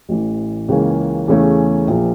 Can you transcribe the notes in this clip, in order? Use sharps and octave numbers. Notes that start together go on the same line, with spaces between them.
A1 A2 E3
C#2 C#3 E3 A#3 C#4
E2 C#3 E3 A3 C#4
A#1 A#2 F3